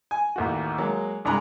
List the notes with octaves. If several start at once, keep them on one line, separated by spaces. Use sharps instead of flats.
G#5
A1 D#2 F#4
F#3 G#3 A#3
C2 G2 G#3 A#5 B5 F#6